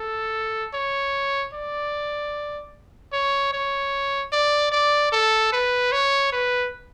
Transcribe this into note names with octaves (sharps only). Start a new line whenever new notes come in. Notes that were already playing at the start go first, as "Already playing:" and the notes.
Already playing: A4
C#5
D5
C#5
C#5
D5
D5
A4
B4
C#5
B4